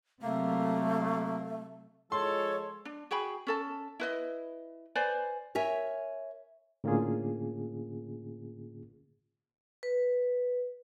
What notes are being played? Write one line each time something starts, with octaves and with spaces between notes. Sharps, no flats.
C3 F#3 A3 A#3
F3 G#3 A4 C#5 C6
D4
F#4 G#4 G5 B5
C#4 A4 A5
E4 B4 D#5
B4 C5 D5 G#5
A#4 C#5 E5 G#5
A2 D3 A#3 C#4 F4 G#4
B4